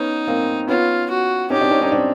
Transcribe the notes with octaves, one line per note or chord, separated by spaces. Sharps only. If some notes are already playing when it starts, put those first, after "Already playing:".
Already playing: B3 C#4 D#4
A#3 C4
B3 C#4 F4
F#4
C#4 D#4 G4
C4 D4
C#4 D#4
C#4 D#4
C4 D4